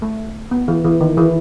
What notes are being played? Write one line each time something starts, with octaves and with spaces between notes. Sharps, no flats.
A3
B3
E3
E3
D#3
E3